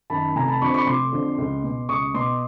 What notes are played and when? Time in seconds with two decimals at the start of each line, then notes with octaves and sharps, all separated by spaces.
0.10 F#2 D#3 A5 B5
0.36 F1 G#5 A#5
0.48 A5 B5
0.61 F2 D3 F3 B5 C#6
0.74 B5 C#6
0.87 F1 C6 D6
1.12 F2 D3 F3
1.38 C#2
1.64 B2
1.89 C#2 C#6 D#6
2.14 B2 C6 D6